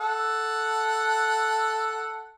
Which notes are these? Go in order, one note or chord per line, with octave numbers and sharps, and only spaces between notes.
A4 F#5